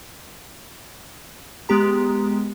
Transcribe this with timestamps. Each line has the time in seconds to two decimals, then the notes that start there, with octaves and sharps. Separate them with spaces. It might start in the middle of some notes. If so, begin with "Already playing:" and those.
1.69 G#3 B3 G4 A#5